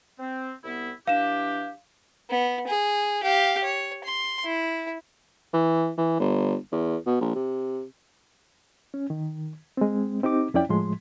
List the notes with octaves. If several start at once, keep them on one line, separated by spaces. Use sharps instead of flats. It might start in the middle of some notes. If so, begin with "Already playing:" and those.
C4
C2 B3 E4
E3 D4 G4 F5 E7
B3
G#4
G4 F5
C#5
C6
E4
E3
E3
G1
E2
B2
A#1
C3
C#4
D#3
G#3 C4
C4 D#4 G4 D6
F2 C#4 E4 D5 G5
A2 F3 G#3 C6